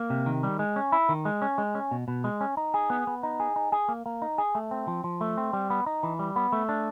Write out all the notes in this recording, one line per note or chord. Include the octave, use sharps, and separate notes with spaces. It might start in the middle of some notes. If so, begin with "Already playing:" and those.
Already playing: A#3
C3
D#3
G3
G#3
C#4
E4
D#3
G#3
C#4
G#3
C#4
B2
B2
G#3
C#4
D#4
G#4
B3
B3
D#4
G#4
D#4
G#4
A#3
A#3
D#4
G#4
A3
C4
F3
F3
A3
C4
G3
B3
D#4
E3
G3
B3
A3
D4